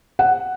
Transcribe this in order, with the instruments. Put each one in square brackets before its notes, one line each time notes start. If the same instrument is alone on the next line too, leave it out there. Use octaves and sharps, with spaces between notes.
[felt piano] F#5